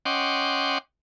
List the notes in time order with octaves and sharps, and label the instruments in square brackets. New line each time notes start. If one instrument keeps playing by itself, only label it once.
[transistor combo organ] C#4 D#5 F#5 G5 C6 D6